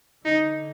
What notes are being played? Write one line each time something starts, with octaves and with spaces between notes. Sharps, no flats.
D3 D#4